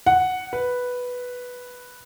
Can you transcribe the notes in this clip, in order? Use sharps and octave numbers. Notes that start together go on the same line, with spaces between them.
F#5
B4